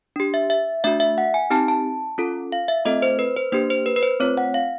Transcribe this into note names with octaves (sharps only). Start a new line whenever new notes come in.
D4 G4
E5
E5
A3 D4 F#4 E5
E5
F#5
G#5
C4 D#4 G4 A5
A5
C#4 F4 A4
F5
E5
A3 C4 F4 A4 D#5
C5
B4
C5
A#3 D4 G4 C5
C5
B4
B4
C5
A3 C4 F4 C#5
F#5
F5